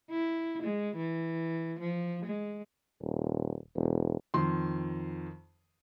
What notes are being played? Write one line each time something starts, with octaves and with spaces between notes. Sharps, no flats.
E4
G#3
E3
F3
G#3
D#1
E1
F2 D#3 C6